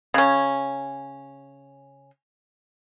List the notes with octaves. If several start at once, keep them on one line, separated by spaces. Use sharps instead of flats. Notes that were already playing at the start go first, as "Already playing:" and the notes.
C#3 C#4